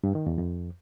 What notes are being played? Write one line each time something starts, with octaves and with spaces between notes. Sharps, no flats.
G2
D#3
E2
F2